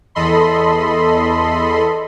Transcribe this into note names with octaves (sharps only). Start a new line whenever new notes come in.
E2 A4 D#5 B5 C6